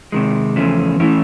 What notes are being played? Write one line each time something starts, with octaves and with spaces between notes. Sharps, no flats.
C3 D#3 G#3
E2 C#3 F3 A3 C#4
E3 A3 C#4 E4